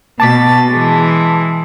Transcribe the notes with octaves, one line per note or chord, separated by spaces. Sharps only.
B2 A5 D6 A6 B6
E3 G#3